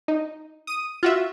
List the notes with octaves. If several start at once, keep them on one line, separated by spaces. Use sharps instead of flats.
D#4
D#6 D#7
F4 F#4 E5